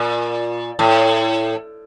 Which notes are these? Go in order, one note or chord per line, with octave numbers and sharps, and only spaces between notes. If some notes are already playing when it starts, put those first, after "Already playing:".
Already playing: A#2
A2